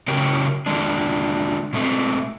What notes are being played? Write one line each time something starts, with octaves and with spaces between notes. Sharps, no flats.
C#3 F#3 C#4 G4 A#4
D3 D#3 G#3 D4
B2 G#3 A3 C4